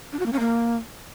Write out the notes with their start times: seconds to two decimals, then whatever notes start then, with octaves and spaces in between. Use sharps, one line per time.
0.12 D4
0.19 F#4
0.26 A#3
0.33 C#4
0.39 A#3